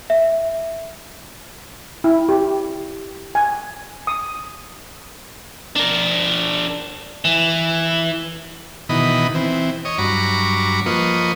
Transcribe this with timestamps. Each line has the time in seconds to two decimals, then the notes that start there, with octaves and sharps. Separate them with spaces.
0.10 E5
2.04 E4
2.29 G4
3.35 G#5
4.07 D#6
5.76 D4 A#4
7.25 E3
8.89 B2 D#3 E3 D#5 B5
9.35 E3 C4
9.85 C#5 D#5
9.98 G2 F#3 A#5 B5 C#6 D6
10.86 F3 A#3 B4 D#5 C#6